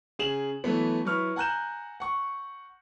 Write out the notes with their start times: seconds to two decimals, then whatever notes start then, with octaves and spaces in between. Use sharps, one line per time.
0.19 C#3 G#4 E7 F#7
0.64 E3 F#3 A3 B3
1.05 F#3 E4 B4 C#6 F6
1.36 F#5 G#5 A#5 F#6 G6 E7
2.00 F#5 C#6